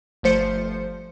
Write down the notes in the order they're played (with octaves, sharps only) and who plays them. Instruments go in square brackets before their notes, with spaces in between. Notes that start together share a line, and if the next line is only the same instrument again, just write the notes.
[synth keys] G1 F3 A3 C5 C#7